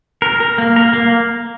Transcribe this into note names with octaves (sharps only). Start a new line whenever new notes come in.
A#4
A#4
A#3
A#4
A#3